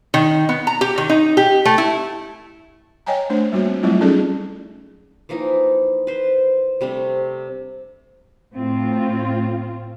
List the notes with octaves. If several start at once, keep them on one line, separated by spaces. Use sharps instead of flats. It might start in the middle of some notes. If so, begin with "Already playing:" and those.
D#3
B3
A#5
G4
D#3
D#4
G4
A3
E4
C#5 D#5 G5 G#5 A#5
A3 D4 C5
G3 A#3 F#4 C#5
C4
F#3 G3 A3 C4 E4 F4
F#3 C#4 D#4 G#4 A4 D5
E3 F3 A#3 D#4
B4 C5
C3 G3 A3 D4
A2 C4 F4